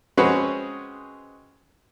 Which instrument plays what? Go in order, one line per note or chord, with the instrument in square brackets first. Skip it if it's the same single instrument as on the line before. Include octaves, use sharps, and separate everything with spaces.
[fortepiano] G#3 C4 C#4 F#4 G#4 B4